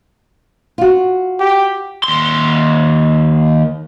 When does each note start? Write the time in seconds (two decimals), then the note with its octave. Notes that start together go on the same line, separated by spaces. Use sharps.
0.78 F4 F#4
1.40 G4
2.04 D#2 C6